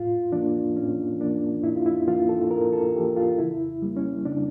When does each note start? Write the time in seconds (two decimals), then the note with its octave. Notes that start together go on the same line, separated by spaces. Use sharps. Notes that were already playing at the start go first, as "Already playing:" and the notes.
Already playing: A2 F4
0.32 E3 A#3 D4
0.76 A2 C#4
1.20 E3 A#3 D4
1.63 A2 E4
1.76 F4
1.86 E4
2.07 E3 A#3 F4
2.29 A4
2.51 A2 A#4
2.73 A4
2.95 E3 A#3 G4
3.17 F4
3.38 C#3 E4
3.82 G3 A#3
3.97 C#4
4.25 C#3 D4